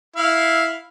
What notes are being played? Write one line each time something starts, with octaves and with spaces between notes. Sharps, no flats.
E4 F5